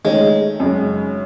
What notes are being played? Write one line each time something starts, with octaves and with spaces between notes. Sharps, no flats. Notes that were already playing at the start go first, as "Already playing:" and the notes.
D#3 G#3 A3 C#4
F#2 C#3 G#3